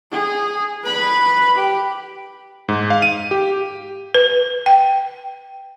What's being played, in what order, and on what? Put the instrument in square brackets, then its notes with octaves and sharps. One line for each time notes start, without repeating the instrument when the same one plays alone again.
[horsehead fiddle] G#4
B4 B5
G4
[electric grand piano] G#2
F5
D#7
G4
[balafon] B4
G5